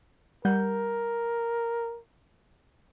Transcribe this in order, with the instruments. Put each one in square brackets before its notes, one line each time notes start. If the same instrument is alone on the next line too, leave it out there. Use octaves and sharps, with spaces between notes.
[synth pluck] G3 F#5 G6 [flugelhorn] A#4